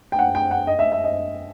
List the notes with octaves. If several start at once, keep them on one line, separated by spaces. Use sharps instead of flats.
G5
F#5
G5
F#5
D#5
E5
E5
D#5